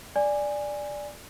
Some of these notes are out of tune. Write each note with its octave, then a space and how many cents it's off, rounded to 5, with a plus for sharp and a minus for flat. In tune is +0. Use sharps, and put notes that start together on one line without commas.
D5 +0 G#5 -10